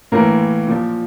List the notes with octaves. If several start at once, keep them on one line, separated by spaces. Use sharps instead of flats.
A2 E3 A#3 A#4
A#2 F3